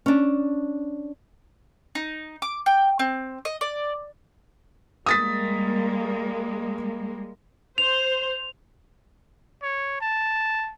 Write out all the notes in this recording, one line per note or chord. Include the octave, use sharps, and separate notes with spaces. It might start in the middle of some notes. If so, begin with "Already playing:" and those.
C#4 D4
D#4
D6
G5
C4
D#5
D5
G3 G#3 A#3 D#6 A6 B6
C5 F7
C#5
A5